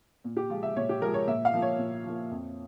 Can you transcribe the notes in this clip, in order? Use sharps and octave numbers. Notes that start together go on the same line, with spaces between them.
A#2
G4
F3 G#3 F4
E5
A#2 C#5
G4
F3 G#3 A#4
C#5
A#2 E5
F5
F3 A#3
C#5
A#2
F3 A#3
F2